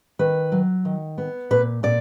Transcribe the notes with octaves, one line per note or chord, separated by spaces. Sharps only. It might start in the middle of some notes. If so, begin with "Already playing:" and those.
D#3 B4
F#3
D#3
B3
A#2 B4
A#2 D5